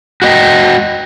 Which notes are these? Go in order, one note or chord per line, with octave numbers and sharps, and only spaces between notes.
F#4 G4 D5 D#5 G5